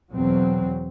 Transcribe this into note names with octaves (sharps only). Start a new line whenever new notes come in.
E2 B2 F#3 C4